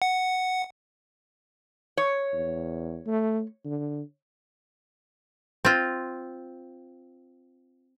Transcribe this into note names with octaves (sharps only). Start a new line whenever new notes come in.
F#5
C#5
E2
A3
D3
C4 F4